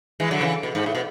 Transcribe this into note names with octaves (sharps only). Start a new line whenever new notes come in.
E3 G#3
D3 F#3
C#3 E3
B2
G#2
A2
B2